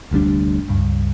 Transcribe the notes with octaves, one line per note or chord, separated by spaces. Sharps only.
F1 D2 G3 D4
C#2 G2